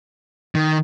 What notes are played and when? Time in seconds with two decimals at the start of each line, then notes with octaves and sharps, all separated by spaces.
0.55 D#3